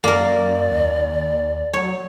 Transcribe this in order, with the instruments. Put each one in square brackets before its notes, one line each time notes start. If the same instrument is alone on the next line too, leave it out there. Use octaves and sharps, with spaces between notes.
[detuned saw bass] F#2 [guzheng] A#3 A#4 [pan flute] D5
[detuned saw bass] D#2
[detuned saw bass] F#3 [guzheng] C#5